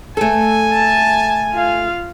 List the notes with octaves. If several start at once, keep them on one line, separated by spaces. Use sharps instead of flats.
A3 A4 G#5
A5
F4 F5